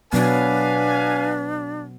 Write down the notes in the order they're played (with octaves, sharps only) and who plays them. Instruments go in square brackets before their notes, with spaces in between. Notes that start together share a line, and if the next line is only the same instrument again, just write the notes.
[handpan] B2 F#3 B3 [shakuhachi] D4 [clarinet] B4 [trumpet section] F5 G#5